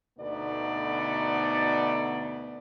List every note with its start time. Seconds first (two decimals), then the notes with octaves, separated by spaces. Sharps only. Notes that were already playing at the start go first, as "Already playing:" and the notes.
0.19 D2 B2 D3 B3 D#4 D5